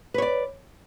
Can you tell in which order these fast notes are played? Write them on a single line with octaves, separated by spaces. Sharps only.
B4 C#5 D5